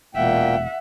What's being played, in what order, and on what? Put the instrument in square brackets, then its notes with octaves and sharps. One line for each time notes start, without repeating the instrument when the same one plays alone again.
[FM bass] E1 [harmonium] A#2 A#3 G5 [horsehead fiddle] E5 F#5